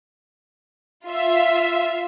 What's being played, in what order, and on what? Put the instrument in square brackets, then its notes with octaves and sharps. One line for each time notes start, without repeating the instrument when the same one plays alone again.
[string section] F4 E5